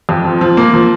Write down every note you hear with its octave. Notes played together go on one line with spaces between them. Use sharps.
F2
F3
F3
A#3
F3